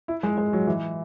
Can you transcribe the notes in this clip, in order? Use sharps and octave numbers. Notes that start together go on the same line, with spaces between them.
E4
G#3
G#3
F#3
E3